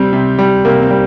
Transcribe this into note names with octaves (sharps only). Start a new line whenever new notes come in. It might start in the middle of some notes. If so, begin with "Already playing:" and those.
Already playing: C3 G3 C4
C3
G3
C3 A#3
C4
G3